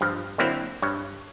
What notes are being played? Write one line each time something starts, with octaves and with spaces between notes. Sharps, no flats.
G2 F3
D3 F#3 A#3 C4 E4
G2 C#5